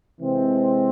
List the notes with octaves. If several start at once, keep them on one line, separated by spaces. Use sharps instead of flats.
C3 E3 G#3 C4